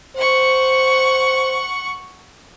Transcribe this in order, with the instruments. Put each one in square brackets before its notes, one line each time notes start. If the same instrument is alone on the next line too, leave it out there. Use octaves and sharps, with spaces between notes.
[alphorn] C5 [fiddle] F#5 C#6